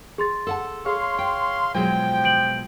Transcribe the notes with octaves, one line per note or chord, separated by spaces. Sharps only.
G#4 C6 A6
A4 F#5 A5
G#4 C#5 F5 C6
G5
B2 F3 F#3 G#3 G5
G6 D7 F#7